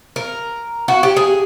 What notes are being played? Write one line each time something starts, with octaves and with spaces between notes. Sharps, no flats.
A#4
F#4
G4
G#4